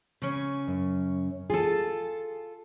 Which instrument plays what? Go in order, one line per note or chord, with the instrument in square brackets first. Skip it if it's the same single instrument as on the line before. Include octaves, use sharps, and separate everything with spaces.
[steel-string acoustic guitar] C#3 C#4
[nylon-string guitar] F#2
[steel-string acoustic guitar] F4 A4 [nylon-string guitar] G#4